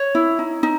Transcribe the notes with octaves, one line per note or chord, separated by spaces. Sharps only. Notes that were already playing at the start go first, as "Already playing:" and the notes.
Already playing: C#5
E4
D#4
D#4